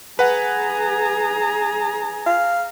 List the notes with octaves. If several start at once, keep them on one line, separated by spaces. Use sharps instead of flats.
G#4 B4 F#5 G#5 A#5
F5